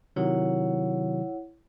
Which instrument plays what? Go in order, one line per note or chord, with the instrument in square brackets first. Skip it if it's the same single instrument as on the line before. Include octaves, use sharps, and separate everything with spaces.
[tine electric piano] C3 D#3 F#3 [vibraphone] E4 C#5 F#5